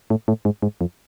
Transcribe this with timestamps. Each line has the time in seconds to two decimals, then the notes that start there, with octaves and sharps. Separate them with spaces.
0.10 A2
0.28 A2
0.45 G#2
0.62 G#2
0.81 F2